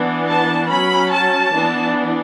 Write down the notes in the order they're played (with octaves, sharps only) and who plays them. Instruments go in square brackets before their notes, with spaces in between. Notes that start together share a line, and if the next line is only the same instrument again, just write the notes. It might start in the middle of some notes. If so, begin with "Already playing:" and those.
Already playing: [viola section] E3 B3 D4
A5
F#3 C#4 B5
A5
E3 B3 D4